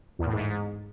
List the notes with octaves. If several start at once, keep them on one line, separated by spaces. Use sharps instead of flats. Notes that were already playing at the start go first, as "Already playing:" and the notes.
E2
A2
G#2